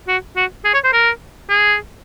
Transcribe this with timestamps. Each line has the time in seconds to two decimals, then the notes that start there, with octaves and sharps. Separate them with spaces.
0.08 F#4
0.36 F#4
0.65 G#4
0.74 C#5
0.84 C5
0.93 A#4
1.49 G#4